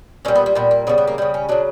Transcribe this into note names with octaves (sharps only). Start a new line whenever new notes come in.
A#2 G3 C#4
B3
A#3
A#2 G3 B3
A#3
C#3 G3 B3
B3
A#3
C#3 G3 B3
C#4
C#3 F#3 D4